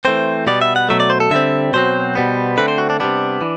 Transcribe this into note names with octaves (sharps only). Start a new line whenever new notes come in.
E3 A3 C4 C5
B2 G3 B3 D5
E5
F#5
B2 F#3 A3 E5
D5
C5
A4
D3 G3 C4 E5
B2 F#3 C4 C5
B2 G3 B3
D3 A3 C4 B4
C5
F#4
D4
C3 G3 B3 D4
E3